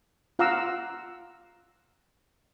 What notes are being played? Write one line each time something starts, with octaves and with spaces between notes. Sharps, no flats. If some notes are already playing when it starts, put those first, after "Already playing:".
F4 F5 F#5 A#5 D6 E6